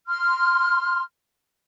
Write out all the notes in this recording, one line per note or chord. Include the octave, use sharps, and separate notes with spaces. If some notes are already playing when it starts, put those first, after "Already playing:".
C6 F6